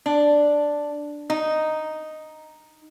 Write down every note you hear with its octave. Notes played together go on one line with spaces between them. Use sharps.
D4
D#4